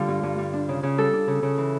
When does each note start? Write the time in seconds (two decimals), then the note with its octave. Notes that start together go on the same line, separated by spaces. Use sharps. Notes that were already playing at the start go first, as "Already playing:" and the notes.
Already playing: D3 G3 F4
0.08 G2
0.23 G2
0.38 G3
0.53 D4
0.69 C#3
0.83 C#3
0.98 G3 A4
1.13 D4
1.28 C#3
1.43 C#3
1.58 E3